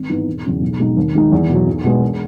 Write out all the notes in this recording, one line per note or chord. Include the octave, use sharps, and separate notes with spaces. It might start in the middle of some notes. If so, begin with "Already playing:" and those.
Already playing: G#1
G#2 E3 B3 D#4
E1
E2 C#3 F#3
B1
B2 G#3 D#4
D#2
D#3 G#3 D#4
E2
B2 F#3
B1
B2 G#3 B3
E1